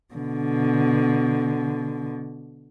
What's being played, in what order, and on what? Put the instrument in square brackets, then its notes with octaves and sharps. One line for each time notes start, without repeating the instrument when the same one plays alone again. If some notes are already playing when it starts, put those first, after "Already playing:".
[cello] B2 D3